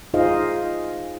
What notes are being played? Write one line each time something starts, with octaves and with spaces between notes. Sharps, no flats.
D#4 F4 G#4 C5 D#5 F5